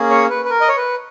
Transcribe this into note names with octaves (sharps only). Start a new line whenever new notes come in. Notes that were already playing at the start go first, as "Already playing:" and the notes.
Already playing: A#3 C#4 G#4
C#5
B4
B4
A#4
D#5
C#5
B4